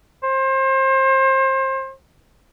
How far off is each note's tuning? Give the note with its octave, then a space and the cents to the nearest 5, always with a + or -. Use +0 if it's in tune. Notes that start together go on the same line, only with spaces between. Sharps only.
C5 +30